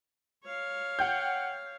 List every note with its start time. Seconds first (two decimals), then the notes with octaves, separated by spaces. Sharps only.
0.44 C#5 F5
0.99 F#5 G5 G6